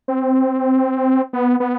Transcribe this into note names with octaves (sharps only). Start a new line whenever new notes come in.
C4
B3
B3